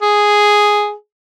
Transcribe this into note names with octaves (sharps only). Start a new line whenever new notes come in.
G#4